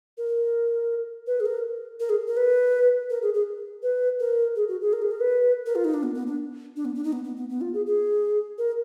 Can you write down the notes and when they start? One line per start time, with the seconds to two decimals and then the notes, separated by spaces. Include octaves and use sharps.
0.18 A#4
1.27 B4
1.40 G#4
1.46 A#4
2.00 A#4
2.09 G#4
2.28 A#4
2.37 B4
3.10 A#4
3.22 G#4
3.34 G#4
3.83 B4
4.20 A#4
4.56 G#4
4.68 F#4
4.81 G#4
4.93 A#4
5.02 G#4
5.11 A#4
5.20 B4
5.66 A#4
5.75 F4
5.85 D#4
5.94 D4
6.03 B3
6.15 B3
6.27 D4
6.76 D4
6.85 B3
6.95 D4
7.04 D#4
7.13 B3
7.24 B3
7.36 B3
7.49 B3
7.61 F4
7.74 G#4
7.86 G#4
8.58 A#4